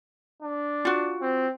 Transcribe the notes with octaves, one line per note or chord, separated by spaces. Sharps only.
D4
F4 F#4
C4